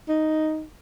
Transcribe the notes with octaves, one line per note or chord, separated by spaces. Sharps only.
D#4